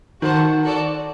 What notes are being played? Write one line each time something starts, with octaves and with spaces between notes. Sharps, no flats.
D#3 F#4 C5 F#5 A5
F#4 A4 D5 A5